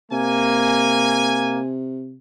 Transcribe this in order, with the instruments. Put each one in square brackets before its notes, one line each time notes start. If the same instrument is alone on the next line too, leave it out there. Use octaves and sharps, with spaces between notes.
[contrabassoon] C3 [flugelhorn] A#3 [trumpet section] G#5